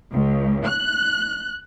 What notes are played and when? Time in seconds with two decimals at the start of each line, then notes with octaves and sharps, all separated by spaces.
0.13 C#2
0.66 F#6